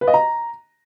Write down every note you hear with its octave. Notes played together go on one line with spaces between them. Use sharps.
B4
D#5
A#5